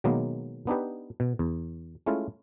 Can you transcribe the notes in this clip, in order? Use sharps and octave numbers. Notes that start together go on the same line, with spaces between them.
B2 D#3 F#3 G#3 A#3 B3
B3 D4 D#4 G4 B4
B2
E2
G#3 A3 C#4 E4 F4